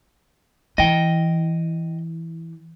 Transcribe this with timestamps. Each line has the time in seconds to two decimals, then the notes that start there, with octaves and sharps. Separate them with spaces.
0.78 E3 D#5 G5